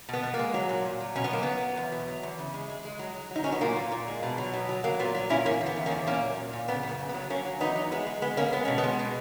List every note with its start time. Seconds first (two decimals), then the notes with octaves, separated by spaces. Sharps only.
0.09 B2 B3
0.23 B2
0.34 A#3
0.39 G#3
0.54 F#3
0.69 A#2
0.85 A#2
1.00 F#3
1.15 B2 C#4
1.24 B3
1.31 F#3 A#3
1.43 F#3 B3
1.61 F#3
1.77 E2
1.92 B2
2.08 F#3
2.23 E2
2.38 C#3
2.54 G#3
2.70 G#3
2.85 G#3
2.99 F#3
3.15 F#3
3.31 F#3 D#4
3.44 F#3 C#4
3.52 B3
3.61 A#2 A#3
3.77 A#2
3.92 A#2
4.08 G#3
4.23 B2
4.38 F#3
4.53 B2
4.69 F#3
4.84 F#3 A#3
4.99 A#2 B3
5.15 F#3
5.30 A#2 C#4 E4
5.46 E2 A#3 C#4
5.61 E2
5.66 B3
5.76 D#3
5.86 A#3 C#4
5.91 E2
6.07 A#2 A#3 C#4
6.22 F#3
6.38 A#2
6.53 A#2
6.68 C#3 B3
6.83 F#2
6.89 A#3
6.99 C#3
7.09 B3
7.14 F#3
7.30 F#3 A#3 C#4
7.45 F#3
7.60 E2 B3 D#4
7.76 F#3
7.91 G#3 B3
8.07 G#3
8.22 G#3 B3
8.37 G#3 A#3 C#4
8.52 G#3 B3
8.65 B2 C#4
8.78 B3
8.83 G#3
8.99 B2